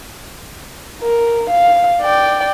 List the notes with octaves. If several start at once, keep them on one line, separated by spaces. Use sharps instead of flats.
A#4
F5
D5 G5